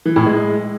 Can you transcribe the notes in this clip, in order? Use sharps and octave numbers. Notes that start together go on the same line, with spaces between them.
E3
A2
G#3